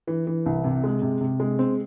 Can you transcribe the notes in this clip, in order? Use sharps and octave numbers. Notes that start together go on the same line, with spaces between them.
E3
E3
C2
C3
G#3
C3
C3
G#3
C4